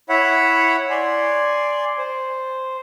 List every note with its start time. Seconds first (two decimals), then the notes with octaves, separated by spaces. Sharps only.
0.09 E4 C#5 E5 F#5 B5
0.90 D5 G#5 C6
1.98 C5